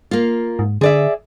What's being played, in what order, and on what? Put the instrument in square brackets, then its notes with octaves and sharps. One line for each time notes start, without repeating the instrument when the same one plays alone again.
[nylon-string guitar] A#3 F4
[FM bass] G#2
[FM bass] D3 [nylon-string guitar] G#4 D5 E5